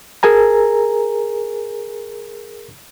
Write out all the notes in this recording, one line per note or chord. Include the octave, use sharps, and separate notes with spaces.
G#4 A#4 G#5 A#5